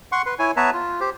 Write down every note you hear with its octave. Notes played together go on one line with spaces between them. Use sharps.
F#5 C6 C#6
B4 C6
E4 C#5 G#5
B3 B4 C#5 E5 A5 A#5
F4
G4 C5